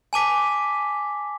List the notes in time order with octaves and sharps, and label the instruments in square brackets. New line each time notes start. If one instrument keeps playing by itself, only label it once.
[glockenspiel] G#5 A5 D6 B6